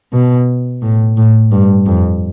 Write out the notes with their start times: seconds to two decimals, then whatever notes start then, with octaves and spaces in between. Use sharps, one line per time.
0.13 B2
0.82 A2
1.17 A2
1.52 G2
1.86 F2